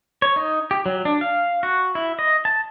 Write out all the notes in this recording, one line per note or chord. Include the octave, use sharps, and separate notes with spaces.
C#5
D#4
G4
F#3
D4
F5
F#4
E4
D#5
A5